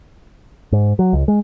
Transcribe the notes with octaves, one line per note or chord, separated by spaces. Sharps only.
G#2
F#3
C#2
G#3